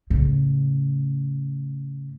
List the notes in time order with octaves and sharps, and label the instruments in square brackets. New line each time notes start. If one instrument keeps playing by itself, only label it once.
[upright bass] A2 C#3